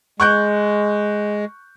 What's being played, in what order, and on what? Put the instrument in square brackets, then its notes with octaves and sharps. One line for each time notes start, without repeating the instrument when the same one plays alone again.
[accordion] G#3 [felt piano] C#6 F#6 G6